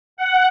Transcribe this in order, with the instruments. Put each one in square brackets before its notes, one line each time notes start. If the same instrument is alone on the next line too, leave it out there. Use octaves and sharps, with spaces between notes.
[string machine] F#5